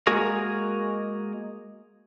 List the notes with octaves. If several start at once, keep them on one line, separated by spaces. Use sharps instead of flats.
G#3 A#3 F#4 G#4 A#4